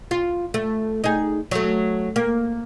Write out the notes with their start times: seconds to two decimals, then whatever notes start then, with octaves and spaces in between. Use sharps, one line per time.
0.11 F4
0.54 A3
1.04 D#4 G#4
1.51 F#3 A3
2.16 A#3